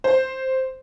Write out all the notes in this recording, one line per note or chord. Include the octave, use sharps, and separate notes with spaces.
C5